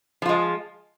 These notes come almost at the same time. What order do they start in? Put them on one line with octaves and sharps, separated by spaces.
F3 F4 G#3